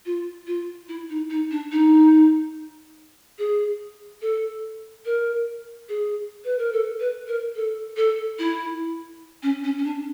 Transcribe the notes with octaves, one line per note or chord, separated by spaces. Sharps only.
F4
F4
E4
D#4
D#4
D4
D#4
G#4
A4
A#4
G#4
B4
A#4
A4
B4
A#4
A4
A4
E4
C#4
C#4
C#4
D4